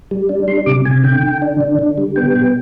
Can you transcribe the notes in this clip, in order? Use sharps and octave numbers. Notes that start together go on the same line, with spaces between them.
G3
D4
G3 C6
C3 D6
C3 G#5
D3 G5
D3
D4
D3
D3
G3
B3 G5
B2